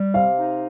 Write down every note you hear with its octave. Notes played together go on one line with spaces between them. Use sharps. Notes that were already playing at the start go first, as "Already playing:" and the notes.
Already playing: G3
C3 F5
D#4